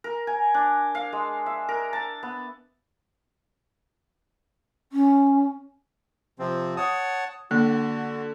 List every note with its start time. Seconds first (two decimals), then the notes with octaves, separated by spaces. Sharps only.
0.04 A#4
0.27 G#5
0.54 D4
0.95 F5
1.13 G#3
1.46 E5
1.69 A#4
1.93 A5
2.23 B3
4.92 C#4
6.39 C3 F3 C4
6.77 C#5 F#5 A5 D#6
7.51 D3 A#3 F#4